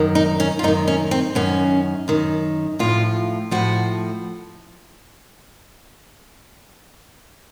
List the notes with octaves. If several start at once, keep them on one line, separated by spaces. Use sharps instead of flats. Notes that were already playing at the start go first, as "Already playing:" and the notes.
Already playing: F#2 D#3
D#4
C#4
F4
F#2 D#3 D#4
C#4
C4
F#2 D#3 C#4
F#2 D#3
A2 F3 F4
A2 F3 F#4